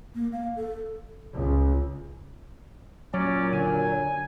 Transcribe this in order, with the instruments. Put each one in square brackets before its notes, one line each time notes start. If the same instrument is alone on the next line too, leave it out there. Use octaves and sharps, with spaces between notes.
[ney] A#3
F5
A4
[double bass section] C#2
[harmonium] A#2 [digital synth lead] F#3 [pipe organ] C#4 D5
[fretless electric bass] D3 [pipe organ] G#5